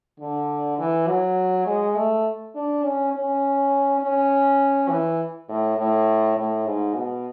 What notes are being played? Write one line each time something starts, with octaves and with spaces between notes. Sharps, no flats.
D3
E3
F#3
G#3
A3
D4
C#4
C#4
C#4
E3
A2
A2
A2
G#2
B2